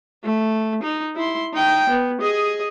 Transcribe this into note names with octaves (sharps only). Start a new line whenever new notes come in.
A3
D#4
E4 C6
D#4 G5
B3
G#4 D#5